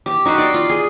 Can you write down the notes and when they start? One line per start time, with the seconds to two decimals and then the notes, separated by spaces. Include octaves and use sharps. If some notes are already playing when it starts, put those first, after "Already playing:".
0.06 G4
0.26 D#4 F#4 G4 C6
0.38 D5 G5
0.54 F4
0.69 G#4